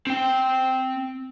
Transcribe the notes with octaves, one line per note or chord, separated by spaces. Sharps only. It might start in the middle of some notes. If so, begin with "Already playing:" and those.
C4 G5